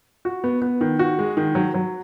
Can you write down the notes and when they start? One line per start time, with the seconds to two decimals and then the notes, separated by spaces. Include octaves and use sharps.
0.25 F#4
0.44 B3
0.62 B3
0.81 D#3
0.99 F#4
1.19 G#3
1.37 D#3
1.55 F#3
1.74 F#3